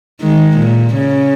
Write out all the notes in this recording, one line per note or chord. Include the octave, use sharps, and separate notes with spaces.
D#3 G#3
A#2
C#3